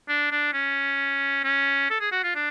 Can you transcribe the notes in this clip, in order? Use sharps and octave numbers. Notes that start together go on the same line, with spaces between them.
D4
D4
C#4
C#4
A4
G#4
F#4
F4
D4